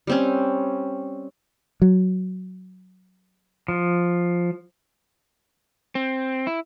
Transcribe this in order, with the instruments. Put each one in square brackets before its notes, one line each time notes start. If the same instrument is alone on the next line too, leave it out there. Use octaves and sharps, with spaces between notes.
[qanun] G3 C4 C#4
[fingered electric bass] F#3
[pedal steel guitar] F3
[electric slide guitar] C4
E4